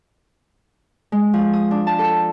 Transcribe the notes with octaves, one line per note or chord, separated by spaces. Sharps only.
G#3
F3
D#6
D4
A5
A4